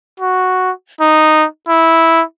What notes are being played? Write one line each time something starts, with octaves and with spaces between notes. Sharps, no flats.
F#4
D#4
E4